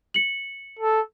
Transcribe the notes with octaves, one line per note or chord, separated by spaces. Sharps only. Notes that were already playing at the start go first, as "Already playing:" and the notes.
C#7 F#7
A4